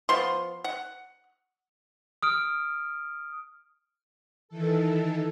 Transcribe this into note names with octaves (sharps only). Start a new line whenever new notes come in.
F3 B3 C6
F#5
D#6 F6 D7
D#3 E3 A4